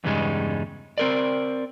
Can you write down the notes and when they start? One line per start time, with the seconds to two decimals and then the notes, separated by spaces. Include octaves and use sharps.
0.04 E2 G2 C#3 G3 G#3 D#4
0.98 C4 A#4 D5